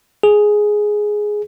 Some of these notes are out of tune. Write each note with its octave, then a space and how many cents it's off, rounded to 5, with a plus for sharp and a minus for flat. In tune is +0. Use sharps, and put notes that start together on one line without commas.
G#4 +5